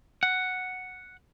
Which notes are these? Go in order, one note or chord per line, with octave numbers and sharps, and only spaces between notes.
F#5